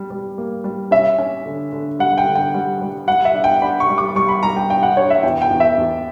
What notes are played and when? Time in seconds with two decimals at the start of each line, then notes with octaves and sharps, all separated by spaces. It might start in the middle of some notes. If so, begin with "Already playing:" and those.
Already playing: G3
0.11 G3
0.38 A#3
0.64 G3
0.91 C#4 E5
1.18 C#4
1.46 D3
1.73 D3
1.99 G3 F#5
2.18 G5
2.26 D3
2.35 G5
2.54 G3
2.81 G3
3.08 G3 F#5
3.25 E5
3.34 D4
3.44 G5
3.62 D4 B5
3.80 C#6
3.89 G3
3.98 D6
4.16 G3 C#6
4.29 B5
4.43 G3 A#5
4.57 G5
4.70 D4 G5
4.83 F#5
4.96 D4 C#5
5.10 E5
5.23 E2 G5
5.42 G5
5.51 E2
5.60 E5
5.78 E2